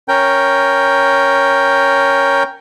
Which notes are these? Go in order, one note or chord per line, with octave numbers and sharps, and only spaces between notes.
C#4 A#4 G5